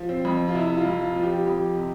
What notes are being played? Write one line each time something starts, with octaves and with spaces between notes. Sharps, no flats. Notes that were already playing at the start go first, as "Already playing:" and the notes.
Already playing: F3
C4
F2
F4
C3 E4
F4
F2
F4
F3
G4
F2 G4
C3